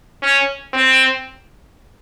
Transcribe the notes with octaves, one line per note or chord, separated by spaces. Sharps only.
C#4
C4